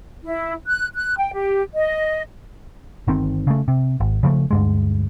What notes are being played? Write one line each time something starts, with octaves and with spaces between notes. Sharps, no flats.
E4
F#6
F#6
G5
G4
D#5
G1 D#3 C4
C#3 A3
C3
G#1
C#3 F3 F#3 A3
D2 G2 G#3